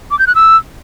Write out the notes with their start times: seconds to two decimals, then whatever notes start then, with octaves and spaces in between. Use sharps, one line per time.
0.11 D6
0.19 G6
0.27 F#6
0.35 E6